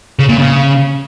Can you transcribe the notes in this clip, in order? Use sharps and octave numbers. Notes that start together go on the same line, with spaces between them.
C#3
A#2
C#3